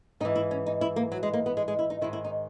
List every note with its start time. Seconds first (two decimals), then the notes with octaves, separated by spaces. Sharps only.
0.20 G#2 D#4
0.25 E3
0.36 E4
0.51 C#4
0.66 D#4
0.81 E4
0.96 A#3
1.12 F#3
1.23 G#3
1.34 A#3
1.46 B3
1.57 G#3
1.68 G#3
1.79 E4
1.90 D#4
2.01 G#2 D#3 E4
2.13 E4
2.25 D#4